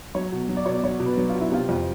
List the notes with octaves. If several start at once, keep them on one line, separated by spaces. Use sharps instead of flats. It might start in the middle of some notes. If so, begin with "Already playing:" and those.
F#3 C#5
B2
F#3
D5
B2 C#5
D5
F#3 C#5
B2
B4
F#3
F4
B2
E4
C3 F4
F2